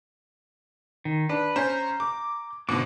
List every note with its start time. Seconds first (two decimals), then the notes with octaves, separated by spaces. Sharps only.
1.05 D#3
1.29 D4 B4
1.56 C#4 C5 A#5 G6
2.00 D6
2.69 G#1 B2 D3 F#4 D6